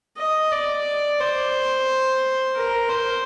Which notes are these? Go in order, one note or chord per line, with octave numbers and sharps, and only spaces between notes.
D#5
D5
C5
A#4
C5